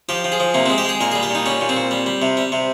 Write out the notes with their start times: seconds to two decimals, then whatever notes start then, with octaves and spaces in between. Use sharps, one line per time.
0.09 F3 G4
0.24 F3
0.32 G#4
0.40 F3
0.54 C3 A#3
0.66 G#3 C4
0.78 G4
0.85 G#3 G#4
1.01 A#2 A#4
1.12 G3 G#4
1.23 G4
1.30 A#2 D#4
1.46 G3 C#4
1.61 A#2
1.69 C4
1.77 A#2
1.91 G3
2.06 G3
2.22 C3
2.37 G3
2.52 C3